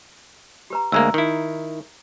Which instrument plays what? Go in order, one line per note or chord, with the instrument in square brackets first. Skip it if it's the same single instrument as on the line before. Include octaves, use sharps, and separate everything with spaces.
[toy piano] G4 B4 A#5
[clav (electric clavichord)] D2 G#3 A#3 [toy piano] A#5 E6
[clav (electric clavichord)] D#3 E4